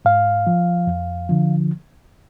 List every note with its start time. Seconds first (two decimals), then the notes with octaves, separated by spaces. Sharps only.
0.05 G#2 F5
0.47 F3
0.87 F2
1.29 D3 F3